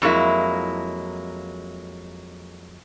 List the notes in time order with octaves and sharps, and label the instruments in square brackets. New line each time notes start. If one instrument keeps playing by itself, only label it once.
[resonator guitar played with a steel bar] F2 F#3 G#3 A#3 E4